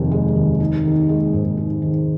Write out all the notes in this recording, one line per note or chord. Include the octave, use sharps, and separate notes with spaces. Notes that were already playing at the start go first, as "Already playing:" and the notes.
Already playing: F1 D#2 D#3
G#3
D#2
D#4
D#3
G#3
G#2
D#4
D#3